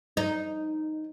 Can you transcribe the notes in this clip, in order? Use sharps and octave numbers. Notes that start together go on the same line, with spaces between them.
D#4